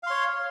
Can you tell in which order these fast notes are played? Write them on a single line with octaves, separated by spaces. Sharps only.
F5 C6 C#5